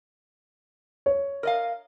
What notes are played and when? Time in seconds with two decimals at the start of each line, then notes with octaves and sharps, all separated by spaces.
1.06 C#5
1.43 A#4 D#5 F5